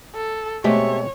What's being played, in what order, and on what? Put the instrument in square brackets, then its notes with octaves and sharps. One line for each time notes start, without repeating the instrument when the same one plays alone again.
[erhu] A4
[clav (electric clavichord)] B2 G#3 C4 [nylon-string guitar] A3 G4 E5 [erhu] C#5